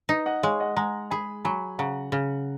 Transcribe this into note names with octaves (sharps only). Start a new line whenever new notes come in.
D#4 B4 D#5
D#5 F#5
G#3 C#5 F5
D#5 F#5
G#3 F#5 A#5
G#4 G#5 B5
F#3 G#5 B5
C#3 F#5 A#5
C#3